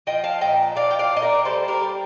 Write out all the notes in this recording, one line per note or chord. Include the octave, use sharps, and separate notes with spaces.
F3 D#5 G5
F5 A5
A#2 D#5 G5
F3 D5 F5
G5
D5 F5
A#2
D#5
A#4 D5
G3 A4 C5
G4 A#4
G3